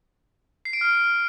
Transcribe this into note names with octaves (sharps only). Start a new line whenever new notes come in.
C7
D7
F6